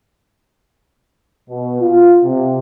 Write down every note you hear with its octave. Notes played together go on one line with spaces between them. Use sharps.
B2
F4
C3